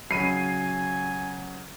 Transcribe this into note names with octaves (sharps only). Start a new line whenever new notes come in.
C#3 F#3 G#5 C7 D#7